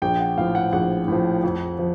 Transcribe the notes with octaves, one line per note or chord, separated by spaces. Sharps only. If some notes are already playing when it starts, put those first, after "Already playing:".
A#1 G5
F#5
A2 F3 F5
F#5
A#1 F#5
A2 F3
F2
F3